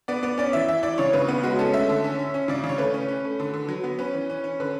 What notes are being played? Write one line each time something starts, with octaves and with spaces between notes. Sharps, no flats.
B3 D5
B3 D5
C#4 D5
E3 E5
E3 E5
E3 D5
C#3 C#5
C#3 B4
B3
G#3 F#4
C#4 A4
A3 E5
D3
C#4
C#4
C#4
C#3 D5
C#3
C#5
A3 B4
C#4
C#4
A3
D3
D3
F#3
B3
C#4 B4
E3
C#4
C#4
D3 B4